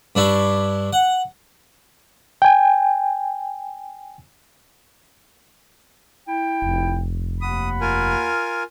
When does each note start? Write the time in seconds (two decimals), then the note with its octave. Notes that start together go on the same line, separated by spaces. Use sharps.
0.15 G2 D4 E4 C#6
0.93 F#5
2.42 G5 G#5
6.28 E4 G5
6.62 F1
7.41 D#2 F#5 B5 D#6
7.81 F4 A#4 G#5